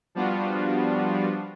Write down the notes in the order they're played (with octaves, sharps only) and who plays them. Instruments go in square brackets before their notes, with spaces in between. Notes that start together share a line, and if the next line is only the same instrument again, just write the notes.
[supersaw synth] F3 G3 B3 D4 F4 F#4